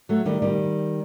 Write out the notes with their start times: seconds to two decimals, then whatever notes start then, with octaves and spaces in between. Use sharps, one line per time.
0.09 F#3 A3
0.26 D#3 G3
0.42 D#3 G3